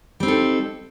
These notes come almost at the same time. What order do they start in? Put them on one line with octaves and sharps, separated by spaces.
G3 C4 D#4 A4